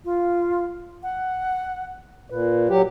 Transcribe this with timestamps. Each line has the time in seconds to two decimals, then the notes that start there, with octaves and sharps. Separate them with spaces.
0.05 F4
1.03 F#5
2.30 A#2 B4
2.69 F#3 G4